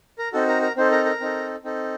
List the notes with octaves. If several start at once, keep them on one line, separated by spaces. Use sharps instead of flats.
A#4
C4 D#4 F#4 A4
A#4
A#4
C4 D#4 A4 C5
A#4
A#4
C4 D#4 A4
C4 D#4 A4